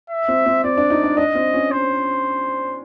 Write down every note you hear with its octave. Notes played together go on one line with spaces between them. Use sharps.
E5
C4
C4
C4 D5
D4
D#4
D4
D4 D#5
C4
C#4
C5